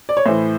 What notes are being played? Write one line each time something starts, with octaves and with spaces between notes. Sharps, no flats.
D5
C#5
A2 E3 C5